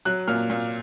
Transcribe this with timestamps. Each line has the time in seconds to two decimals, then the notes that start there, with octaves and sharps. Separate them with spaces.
0.05 F#3 F#6
0.28 A#2 F6
0.50 A#2